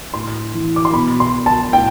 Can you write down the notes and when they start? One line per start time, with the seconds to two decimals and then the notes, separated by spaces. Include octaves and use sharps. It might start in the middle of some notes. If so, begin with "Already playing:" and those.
0.14 A2 C6
0.54 E3
0.76 D6
0.85 C6
0.93 B2 B5
1.20 C6
1.46 A5
1.73 A2 G5